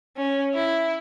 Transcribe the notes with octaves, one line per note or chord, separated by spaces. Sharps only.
C#4
E4